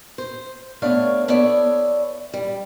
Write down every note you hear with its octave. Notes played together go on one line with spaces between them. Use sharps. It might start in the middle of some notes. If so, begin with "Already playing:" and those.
C5
A3 B3 D4 B4 C#5 F5
B3 E4 A4 C#5 D5
G3